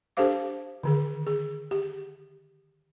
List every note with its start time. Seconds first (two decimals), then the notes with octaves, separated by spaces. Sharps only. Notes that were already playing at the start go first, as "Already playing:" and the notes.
0.17 D4 G4 A4 C5 F5 D6
0.83 D3 D#3 G#4
1.27 G#4
1.71 G4